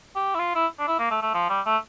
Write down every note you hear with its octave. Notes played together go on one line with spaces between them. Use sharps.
G4
E4
F4
E4
D4
E4
A#3
A3
A3
F3
G3
A3